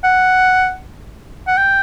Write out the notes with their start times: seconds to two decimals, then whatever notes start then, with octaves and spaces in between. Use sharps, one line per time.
0.04 F#5
1.47 F#5
1.57 G5